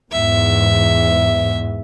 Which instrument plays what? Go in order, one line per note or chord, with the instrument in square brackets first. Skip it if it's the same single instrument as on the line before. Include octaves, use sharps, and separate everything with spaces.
[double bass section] E2 G#2 [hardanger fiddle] E5